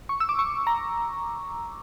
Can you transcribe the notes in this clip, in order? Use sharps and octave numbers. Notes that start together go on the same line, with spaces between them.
C#6
E6
D6
C#6
A#5